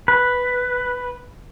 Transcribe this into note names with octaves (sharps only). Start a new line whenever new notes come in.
B4